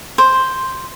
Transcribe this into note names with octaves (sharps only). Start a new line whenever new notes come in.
C5